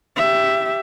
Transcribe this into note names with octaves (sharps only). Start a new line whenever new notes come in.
G4 E5